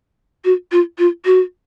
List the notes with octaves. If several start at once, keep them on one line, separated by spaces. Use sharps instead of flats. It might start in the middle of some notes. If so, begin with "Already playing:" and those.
F#4
F4
F4
F#4